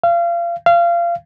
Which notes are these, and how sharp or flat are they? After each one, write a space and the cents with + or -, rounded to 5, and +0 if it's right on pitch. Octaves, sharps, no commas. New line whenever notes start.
F5 -30
F5 -25